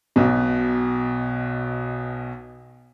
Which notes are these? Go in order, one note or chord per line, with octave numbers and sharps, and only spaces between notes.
B1 B2